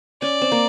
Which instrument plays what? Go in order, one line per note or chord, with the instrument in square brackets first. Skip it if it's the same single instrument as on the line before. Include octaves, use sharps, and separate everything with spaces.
[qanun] C#4 [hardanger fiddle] D5
[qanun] C4
A#3